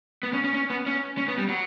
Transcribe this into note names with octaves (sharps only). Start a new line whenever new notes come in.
B3
C#4
C#4
C#4
B3
C#4
C#4
B3
G3
F#3